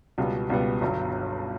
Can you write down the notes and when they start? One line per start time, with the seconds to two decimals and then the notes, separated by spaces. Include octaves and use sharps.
0.18 C#2 B2 G3 B3
0.50 C#2 B2 G3 B3
0.81 G1 G2 F#3